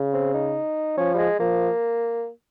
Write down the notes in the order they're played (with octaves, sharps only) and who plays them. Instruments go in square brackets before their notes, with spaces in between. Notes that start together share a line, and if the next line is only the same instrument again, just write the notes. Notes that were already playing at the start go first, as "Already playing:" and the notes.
Already playing: [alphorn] C#3
[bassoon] C4
D#4
[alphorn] F3 [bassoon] C#4
[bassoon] G3
G#3
[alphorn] F3 [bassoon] A#3